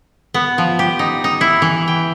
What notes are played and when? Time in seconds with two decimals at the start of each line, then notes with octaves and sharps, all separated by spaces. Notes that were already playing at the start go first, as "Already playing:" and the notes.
0.34 B3
0.58 F3
0.79 G4
0.99 D#4
1.24 D#4
1.41 E4
1.62 E3
1.88 G5